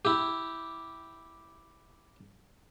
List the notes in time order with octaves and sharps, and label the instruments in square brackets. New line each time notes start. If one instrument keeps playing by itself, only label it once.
[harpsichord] E4 G4